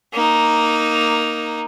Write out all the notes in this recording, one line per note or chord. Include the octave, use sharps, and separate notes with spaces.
A#3 D#4